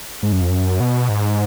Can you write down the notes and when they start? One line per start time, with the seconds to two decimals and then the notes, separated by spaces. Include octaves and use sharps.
0.23 G#2
0.32 F#2
0.42 F2
0.50 F#2
0.80 B2
1.09 G#2